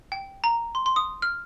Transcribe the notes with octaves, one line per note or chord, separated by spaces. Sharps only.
G5
A#5
C6
C6
D#6
F6